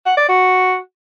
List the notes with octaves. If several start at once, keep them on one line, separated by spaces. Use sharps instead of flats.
F#5
D5
F#4